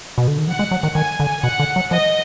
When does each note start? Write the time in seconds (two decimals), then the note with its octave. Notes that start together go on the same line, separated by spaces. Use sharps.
0.18 B2
0.28 D3
0.38 D#3
0.47 F3 F#5
0.59 G#3
0.71 F#3
0.83 D#3
0.95 D#3 G#5
1.20 D3
1.43 B2 F#5
1.60 D3
1.76 F#3
1.91 F3 D#5